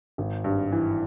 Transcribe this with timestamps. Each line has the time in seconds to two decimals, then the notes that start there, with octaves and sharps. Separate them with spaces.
0.18 G#1
0.44 G2
0.72 E3